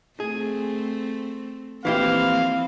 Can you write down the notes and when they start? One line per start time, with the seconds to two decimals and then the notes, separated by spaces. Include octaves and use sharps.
0.20 A3 C4 G#4
1.85 E3 F3 A#3 C4 E4 G4 F5